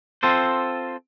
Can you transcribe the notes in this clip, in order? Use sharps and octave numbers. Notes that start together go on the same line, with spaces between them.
C4 F4 A4 C5